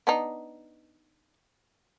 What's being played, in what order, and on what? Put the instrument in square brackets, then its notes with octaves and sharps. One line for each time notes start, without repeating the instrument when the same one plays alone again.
[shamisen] B3 D4 D#4